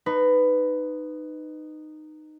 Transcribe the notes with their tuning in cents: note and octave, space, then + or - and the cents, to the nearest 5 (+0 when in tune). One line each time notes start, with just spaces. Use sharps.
D#4 -15 B4 +15